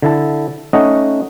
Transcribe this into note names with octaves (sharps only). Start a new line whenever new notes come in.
D3 E4 A5
A3 C#4 D#4 D#5 F#5